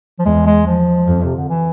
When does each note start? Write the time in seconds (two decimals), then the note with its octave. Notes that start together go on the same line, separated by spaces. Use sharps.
0.19 F3
0.25 E2 G#3
0.46 G#3
0.67 F3
1.08 F2
1.24 C3
1.36 D3
1.49 E3